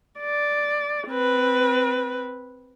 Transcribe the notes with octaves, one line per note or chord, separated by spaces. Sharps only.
D5
C4 B4